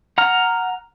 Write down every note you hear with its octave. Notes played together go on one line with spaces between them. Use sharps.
F#5 A#5 F6